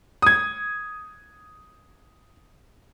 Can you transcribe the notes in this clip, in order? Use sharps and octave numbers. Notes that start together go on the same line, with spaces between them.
D#6 G#6